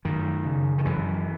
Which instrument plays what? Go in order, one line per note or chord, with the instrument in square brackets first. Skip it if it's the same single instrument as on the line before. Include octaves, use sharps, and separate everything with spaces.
[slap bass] F#2 D#3
C#3
D#3
F#2 E3